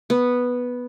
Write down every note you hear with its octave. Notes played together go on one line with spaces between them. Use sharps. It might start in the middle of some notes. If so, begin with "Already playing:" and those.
B3